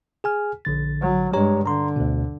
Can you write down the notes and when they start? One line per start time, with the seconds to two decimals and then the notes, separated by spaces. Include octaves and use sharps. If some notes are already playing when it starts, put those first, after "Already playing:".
0.24 G#4 G#5 F6
0.65 A#1 D3 A6
1.01 F#3
1.33 G2 G#3 G4 C#5 A#5
1.66 D3 A#5 C6
1.96 D2 B2